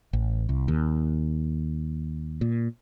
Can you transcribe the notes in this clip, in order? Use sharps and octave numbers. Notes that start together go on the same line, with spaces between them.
A1
C2
D#2
A#2